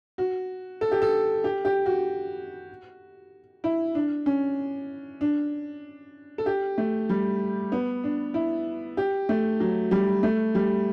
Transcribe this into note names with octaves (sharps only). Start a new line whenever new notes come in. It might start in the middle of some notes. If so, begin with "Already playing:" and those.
F#4
A4
G4
A4
G4
G4
F#4
E4
D4
C#4
D4
A4
G4
A3
G3
B3
D4
E4
G4
A3
F#3
G3
A3
G3